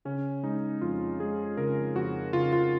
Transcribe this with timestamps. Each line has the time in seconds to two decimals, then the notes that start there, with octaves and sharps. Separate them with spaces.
0.05 C#3 C#4
0.43 G#3 D#4
0.81 F2 F4
1.19 G#3 G#4
1.57 C#3 A#4
1.95 F2 F#4
2.33 C#3 F4
2.53 F4